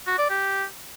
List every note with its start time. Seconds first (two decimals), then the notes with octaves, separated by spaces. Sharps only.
0.07 F#4
0.18 D5
0.30 G4